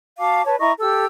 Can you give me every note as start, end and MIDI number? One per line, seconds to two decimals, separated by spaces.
0.19 0.43 66
0.19 0.43 77
0.19 0.43 81
0.19 0.43 86
0.46 0.55 71
0.46 0.55 73
0.46 0.55 81
0.60 0.72 64
0.60 0.72 75
0.60 0.72 82
0.60 0.72 85
0.80 1.05 67
0.80 1.05 69
0.80 1.05 88